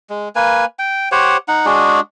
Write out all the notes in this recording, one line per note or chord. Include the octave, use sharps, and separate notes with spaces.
G#3
A#3 B4 G#5
G5
G4 C5 C#5 F#5
D#4 F#5
G#3 D4 F#4 G#4